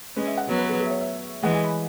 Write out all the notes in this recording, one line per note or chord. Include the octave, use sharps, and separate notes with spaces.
G#3 C#4 B4
E5
F#5
F#3 B3
B4
G#4
G#4
E5
C#5
E5
E3 G#3 F#5
G#5
B5